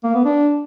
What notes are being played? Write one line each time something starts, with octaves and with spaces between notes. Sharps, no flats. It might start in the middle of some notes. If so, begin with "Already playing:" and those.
A#3
B3
D4